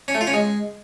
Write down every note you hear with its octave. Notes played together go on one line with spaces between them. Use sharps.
C#4
A3
F4
C#4
G#3